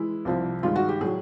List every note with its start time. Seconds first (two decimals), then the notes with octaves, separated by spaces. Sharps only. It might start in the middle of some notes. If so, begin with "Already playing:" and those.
Already playing: E3 G#3 E4
0.25 C2 C3 F3
0.63 G2 D#3 G#3 F4
0.76 F#4
0.89 G4
1.01 A2 F#3 G#4